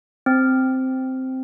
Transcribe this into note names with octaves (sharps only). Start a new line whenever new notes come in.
C4